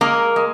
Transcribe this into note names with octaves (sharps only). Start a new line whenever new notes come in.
G#3 A#3 A#4
G#3